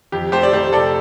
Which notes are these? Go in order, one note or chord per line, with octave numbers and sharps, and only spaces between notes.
F2 G4
A3 G4 C5
D5
F1 G4 C5
C3 A4 D5